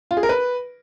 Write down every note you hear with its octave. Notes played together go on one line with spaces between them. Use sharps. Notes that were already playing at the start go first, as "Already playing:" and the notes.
F4
G#4
A#4
B4